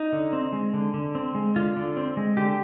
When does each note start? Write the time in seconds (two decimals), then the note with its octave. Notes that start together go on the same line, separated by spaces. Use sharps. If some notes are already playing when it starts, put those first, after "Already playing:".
Already playing: D#4
0.13 D3
0.33 C4
0.53 G#3
0.74 D3
0.94 D3
1.15 C4
1.35 G#3
1.56 D3 F4
1.76 D3
1.97 C4
2.17 G#3
2.37 D3 G4